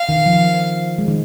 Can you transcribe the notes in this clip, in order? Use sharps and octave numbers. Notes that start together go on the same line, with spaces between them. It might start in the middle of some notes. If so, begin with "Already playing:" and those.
Already playing: F5
D#3
F3
G#3
D#3